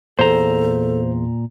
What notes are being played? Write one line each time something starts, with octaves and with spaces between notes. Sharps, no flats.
E2 A#2 A4 C5 A#5 C6